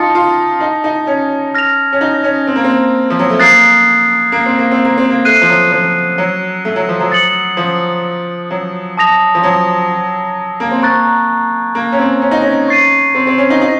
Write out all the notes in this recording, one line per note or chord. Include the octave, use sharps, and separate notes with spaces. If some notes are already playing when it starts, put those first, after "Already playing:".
Already playing: D#4 F4 A5 D#6 A6 C#7
F4
D#4
D#4
C#4
F6 A#6 F7
C#4
D#4
C#4
C4
A#3
C4
F3
F#3
A3
A#3 D#6 F#6 A6 C7
A#3
C4
A#3
C4
A#3
C4
A#3
A3 F#6 C7 D#7
F3
F#3
F3
F#3
A3
F#3
F3
F#3
D#6 A6 C#7 F#7
F3
F#3
A5 D#6 A#6 F7
F3
F#3
A#3
C4
A#3 A#5 C#6 F#6 A6
A#3
C#4
C4
C#4
D#4
C#4
C#6 A6 C7 D#7
C4
C4
C#4
D#4
D#4